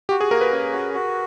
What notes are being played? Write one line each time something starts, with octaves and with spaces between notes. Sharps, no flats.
F#4 G4
G#4
A#3 A#4
B4
C#4
F#4
F#4